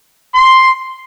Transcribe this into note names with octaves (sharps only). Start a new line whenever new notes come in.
C6